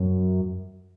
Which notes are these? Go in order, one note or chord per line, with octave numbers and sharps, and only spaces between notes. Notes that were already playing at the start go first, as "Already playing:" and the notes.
Already playing: F#2